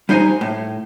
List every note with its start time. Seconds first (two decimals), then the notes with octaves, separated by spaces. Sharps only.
0.09 G3 D#4 C5 G#5 A#5
0.41 A2